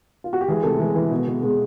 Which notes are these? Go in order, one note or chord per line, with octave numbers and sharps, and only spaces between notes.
F4
F#4
G4
E3 G#3 G#4
C3 A3 A4
E3 G#3 G#4
E3
B2
B2
B2 G#3 G#4